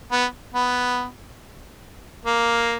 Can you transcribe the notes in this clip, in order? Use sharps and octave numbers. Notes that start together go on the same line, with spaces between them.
B3
B3
A#3